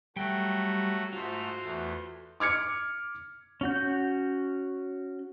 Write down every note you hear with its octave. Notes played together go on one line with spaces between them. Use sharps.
F#3 G3 A3 F#4 G5
G#2 A3 F4 F#4 C5
E2 A3
D6 F6 G#6 C#7
C#4 F#4 G6